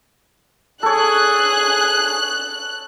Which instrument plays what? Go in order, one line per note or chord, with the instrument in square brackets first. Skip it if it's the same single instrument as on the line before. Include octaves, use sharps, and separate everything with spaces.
[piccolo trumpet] G#4 [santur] A4 C#5 [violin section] F#6